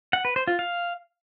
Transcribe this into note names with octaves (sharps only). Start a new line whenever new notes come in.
F#5
B4
C5
F4
F5